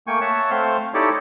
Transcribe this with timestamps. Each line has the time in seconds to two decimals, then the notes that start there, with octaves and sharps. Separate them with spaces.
0.07 A3 A#3 G5 G#5 C#6
0.21 C#5 E5 F#5 A5 C#6
0.50 A3 C4 C5 F5 C6
0.94 D#4 E4 G4 A4 C#5 D5